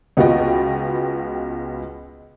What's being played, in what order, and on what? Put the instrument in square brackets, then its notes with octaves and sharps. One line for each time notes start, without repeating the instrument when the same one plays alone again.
[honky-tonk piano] C#2 B3 F4 F#4 D#5 G5